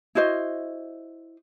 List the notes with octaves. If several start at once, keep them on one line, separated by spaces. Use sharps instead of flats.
E4 F#4 C5 D#5